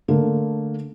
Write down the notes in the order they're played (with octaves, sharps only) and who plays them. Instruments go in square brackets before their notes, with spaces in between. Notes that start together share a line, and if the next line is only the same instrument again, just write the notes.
[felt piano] D3 A3 A#3